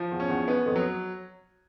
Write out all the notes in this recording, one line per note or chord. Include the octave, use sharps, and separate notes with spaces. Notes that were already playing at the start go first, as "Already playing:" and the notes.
Already playing: F3
E2
C#4
E2
B3
F2
F#3